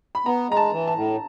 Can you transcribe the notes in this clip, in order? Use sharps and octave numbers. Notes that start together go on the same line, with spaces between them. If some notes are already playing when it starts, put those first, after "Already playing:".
B5
B3 A#5
G#3 A#5
A5
E3
A5
A2